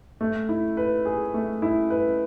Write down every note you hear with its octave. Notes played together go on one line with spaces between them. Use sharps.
A3
E4
B4
G#4
A3
E4
B4